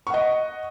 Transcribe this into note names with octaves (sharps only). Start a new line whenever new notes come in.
D#5 F#5 C#6